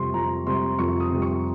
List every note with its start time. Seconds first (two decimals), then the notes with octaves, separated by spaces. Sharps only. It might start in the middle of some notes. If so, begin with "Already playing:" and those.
Already playing: F2 C3 G3 C6 C#6
0.14 F2 A#5
0.47 C3 G3 C6
0.79 F2 C#6
1.00 D#6
1.12 C3 G3
1.22 C#6